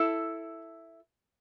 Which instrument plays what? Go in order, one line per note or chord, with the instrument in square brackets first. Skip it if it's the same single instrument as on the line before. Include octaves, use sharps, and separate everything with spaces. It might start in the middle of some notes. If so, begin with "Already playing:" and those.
Already playing: [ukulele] E4 A4 A5